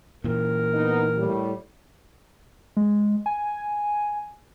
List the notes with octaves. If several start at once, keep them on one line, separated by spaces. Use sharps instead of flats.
A#2 E3 A#4
B3 D#4
A2 G3
G#3
G#5